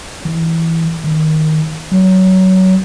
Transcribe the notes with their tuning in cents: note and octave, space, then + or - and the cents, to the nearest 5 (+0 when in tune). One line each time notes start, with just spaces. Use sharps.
E3 -5
D#3 +5
F#3 +20